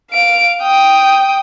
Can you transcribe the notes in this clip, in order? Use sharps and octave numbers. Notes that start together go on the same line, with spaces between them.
F5 D7
G5 D#6